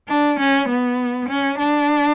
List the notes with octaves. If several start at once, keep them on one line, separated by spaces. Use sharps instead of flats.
D4
C#4
B3
C#4
D4